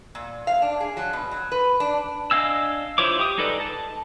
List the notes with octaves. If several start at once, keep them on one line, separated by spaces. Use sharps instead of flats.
A#2
F5
D4
G#4
F#3
B2
F#3
B4
D4
D4 D#5 F5 G#5 E6
E4 F4 C5 C#5 D6
G4 D6 D#6
G#3 D#4 A4 B4 D5
A5